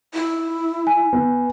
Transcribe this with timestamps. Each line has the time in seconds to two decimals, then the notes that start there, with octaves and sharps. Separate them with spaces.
0.14 E4
0.87 G#5
1.13 B3